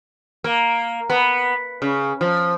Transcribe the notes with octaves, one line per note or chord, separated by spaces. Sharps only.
A#3
B3
C#3
F3